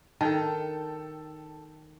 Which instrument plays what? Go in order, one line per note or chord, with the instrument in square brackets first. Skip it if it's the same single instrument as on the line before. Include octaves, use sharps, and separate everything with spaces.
[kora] D#3 [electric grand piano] A4 G5 A5